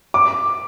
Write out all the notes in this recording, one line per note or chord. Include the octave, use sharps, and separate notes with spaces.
D6